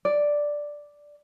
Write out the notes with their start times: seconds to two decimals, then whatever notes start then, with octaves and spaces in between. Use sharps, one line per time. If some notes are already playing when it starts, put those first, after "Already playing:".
0.05 D5